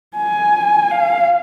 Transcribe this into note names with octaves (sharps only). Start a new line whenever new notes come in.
G#5
F5